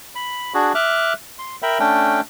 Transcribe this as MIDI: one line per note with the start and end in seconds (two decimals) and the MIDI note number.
0.15 0.53 83
0.54 0.73 62
0.54 0.73 66
0.54 0.73 68
0.75 1.13 76
0.75 1.13 86
0.75 1.13 89
0.75 1.13 90
1.39 1.56 84
1.62 1.79 70
1.62 1.79 76
1.62 1.79 79
1.62 1.79 83
1.80 2.21 57
1.80 2.21 61
1.80 2.21 62
1.80 2.21 79